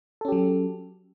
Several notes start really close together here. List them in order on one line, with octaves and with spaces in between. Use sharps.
A4 C#4 G4 F#3